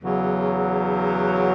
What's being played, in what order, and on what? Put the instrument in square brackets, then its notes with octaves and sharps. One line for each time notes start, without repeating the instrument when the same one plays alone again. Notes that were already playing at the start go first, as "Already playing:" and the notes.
[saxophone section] E2 C#3 F#3